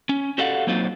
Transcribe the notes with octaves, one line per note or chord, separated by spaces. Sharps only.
C#4
F#4 G4 A4 D5 F5 F#5
F#3 A#3 C4 D#4 F4 F#4